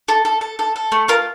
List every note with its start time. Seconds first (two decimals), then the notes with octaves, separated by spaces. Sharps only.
0.08 A4
0.25 A4
0.41 A4
0.59 A4
0.76 A4
0.92 A3
1.08 F4 A#4